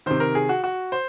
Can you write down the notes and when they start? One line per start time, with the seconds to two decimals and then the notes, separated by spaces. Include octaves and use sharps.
0.06 C3 D#3 C5
0.20 A#4
0.35 G#4
0.49 F#4
0.64 F#4
0.92 C5